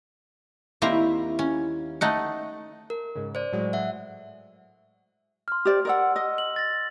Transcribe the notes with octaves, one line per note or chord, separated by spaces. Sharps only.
D#2 G3 A#3 C4 E4 A#5
C#4
A3 D#4 F#5
A#4
G#2 C#3
C5 D5
A2 F#3 G#3
E5 F#5
C6 F6
G4 C5 D5
A#4 D5 F#5 C6 E6
D#5 E6
F#7
A6 A#6